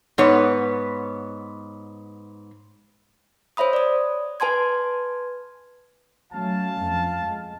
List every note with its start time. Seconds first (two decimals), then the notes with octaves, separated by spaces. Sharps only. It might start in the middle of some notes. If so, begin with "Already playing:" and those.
0.18 G#2 B3 C#5
3.57 C5 C#5 E5 B5 D#6
3.73 D5 D#6
4.40 B4 G#5 A5 C6 G#6
6.32 F#3 A3 C#4 F5 A5
6.80 F2
7.20 G#3